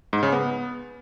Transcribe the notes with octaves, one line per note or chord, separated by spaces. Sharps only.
G#2
C#3
B3